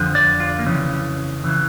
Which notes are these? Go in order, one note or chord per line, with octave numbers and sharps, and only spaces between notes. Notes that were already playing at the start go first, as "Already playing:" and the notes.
Already playing: F2 D3 F3
D5
F4
A#3
F2 C#3 E3 C#4
C#3 E3